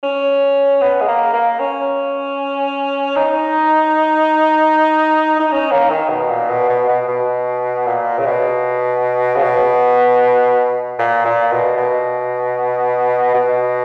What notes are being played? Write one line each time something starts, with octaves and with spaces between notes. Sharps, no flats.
C#4
B3
G#3
A#3
A#3
C#4
D#4
D#4
C#4
A#3
D#3
B2
A#2
B2
B2
B2
B2
A#2
C#3
B2
C#3
B2
A#2
A#2
B2
B2
B2